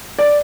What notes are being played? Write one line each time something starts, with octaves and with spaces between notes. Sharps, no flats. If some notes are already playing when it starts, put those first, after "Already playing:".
D5